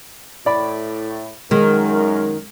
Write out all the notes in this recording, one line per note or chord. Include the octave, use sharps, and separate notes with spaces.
A2 E4 D5 B5
F#2 D#3 G#3 A#4